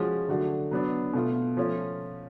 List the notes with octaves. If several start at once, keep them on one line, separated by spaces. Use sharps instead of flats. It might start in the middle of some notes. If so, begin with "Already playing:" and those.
Already playing: F3 G#3 C#4 F#4
D3 F#3 A3 D4 F#4
F#3 B3 D4
B2 A3 F4
F3 A3 C#4 F4